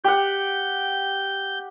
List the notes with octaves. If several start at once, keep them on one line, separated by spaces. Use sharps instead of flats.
G4 F#5 G6